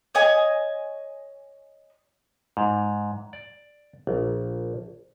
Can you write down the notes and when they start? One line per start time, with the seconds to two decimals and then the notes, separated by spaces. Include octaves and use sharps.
0.15 C#5 D#5 G#5
2.57 G#2
3.33 D5
4.07 A#1